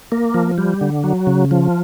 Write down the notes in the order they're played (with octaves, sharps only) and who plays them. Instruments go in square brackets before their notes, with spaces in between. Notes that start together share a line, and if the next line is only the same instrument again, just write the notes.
[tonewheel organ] A#3
F3
G3
D3
F#3
C#3
F3